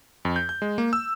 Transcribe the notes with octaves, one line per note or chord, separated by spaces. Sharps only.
F2
G6
G6
G#3
A#3
E6